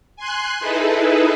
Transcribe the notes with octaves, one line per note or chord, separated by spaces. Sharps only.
G#5 C6 F#6
D#4 E4 G#4 A4 B4